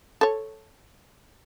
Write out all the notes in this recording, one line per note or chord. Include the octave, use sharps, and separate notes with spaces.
A4 C#5